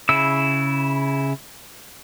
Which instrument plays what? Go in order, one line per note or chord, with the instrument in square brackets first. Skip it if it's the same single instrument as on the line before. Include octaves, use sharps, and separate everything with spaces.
[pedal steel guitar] C#3 E4 E6